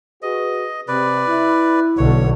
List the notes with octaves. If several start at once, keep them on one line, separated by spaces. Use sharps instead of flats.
F#4 G#4 B4 D#5
C3 B4 D5
E4
B1 D3 C#5